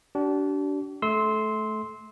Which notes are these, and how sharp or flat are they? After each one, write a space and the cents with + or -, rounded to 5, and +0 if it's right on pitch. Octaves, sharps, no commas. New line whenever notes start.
D4 -20 G4 -45
A3 -20 C6 +0 E6 -25